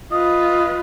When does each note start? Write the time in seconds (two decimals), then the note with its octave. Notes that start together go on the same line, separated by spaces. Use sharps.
0.12 F4 B4 D#5